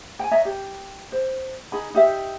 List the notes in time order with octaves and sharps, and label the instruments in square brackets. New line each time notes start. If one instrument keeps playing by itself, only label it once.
[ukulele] G5 G#5
C#5 D#5 E5 A#5
G4
C5
D#4 G#4 B5
D#4 G4 E5